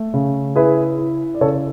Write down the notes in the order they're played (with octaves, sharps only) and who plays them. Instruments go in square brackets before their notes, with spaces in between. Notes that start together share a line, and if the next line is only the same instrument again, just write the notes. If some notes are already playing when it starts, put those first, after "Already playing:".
Already playing: [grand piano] A3
C#3
E4 G#4 B4
E4
D5
C#3 A4 C#5